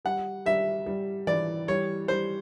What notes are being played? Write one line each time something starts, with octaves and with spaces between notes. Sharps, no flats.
G3 F#5
G3 E5
G3
E3 D5
G3 C#5
G3 C5